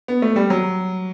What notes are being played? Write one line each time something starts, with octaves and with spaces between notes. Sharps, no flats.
B3
A3
G3
F#3